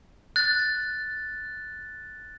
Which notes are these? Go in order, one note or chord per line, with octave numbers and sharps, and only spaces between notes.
F#6 A6